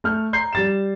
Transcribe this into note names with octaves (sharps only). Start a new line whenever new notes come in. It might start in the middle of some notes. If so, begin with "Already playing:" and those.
A3 F6 G6
A#5 C6 G6 C7
G3 A6 E7